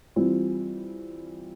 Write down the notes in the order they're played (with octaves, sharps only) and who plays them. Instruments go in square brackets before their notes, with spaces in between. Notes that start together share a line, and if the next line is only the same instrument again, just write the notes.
[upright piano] E3 G3 C4 F4